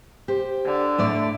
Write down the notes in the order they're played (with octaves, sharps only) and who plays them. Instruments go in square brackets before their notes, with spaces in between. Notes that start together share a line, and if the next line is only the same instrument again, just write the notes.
[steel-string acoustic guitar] G4 C5
[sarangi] D3
[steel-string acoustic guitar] A2 A3 D5